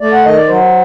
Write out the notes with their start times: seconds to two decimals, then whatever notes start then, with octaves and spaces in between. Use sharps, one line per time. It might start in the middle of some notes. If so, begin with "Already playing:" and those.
0.01 A3 D5
0.12 F#5
0.24 D#3 D#5
0.37 D5
0.48 F#3 C5